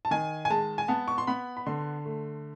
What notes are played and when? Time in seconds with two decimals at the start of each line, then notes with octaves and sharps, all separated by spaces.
0.05 A5
0.11 D#3 G#5
0.45 G#5
0.50 G#3 A5
0.78 G#5
0.88 B3 A5
1.08 C#6
1.18 C6
1.27 B3 B5
1.57 B5
1.66 D3 C6
2.05 A3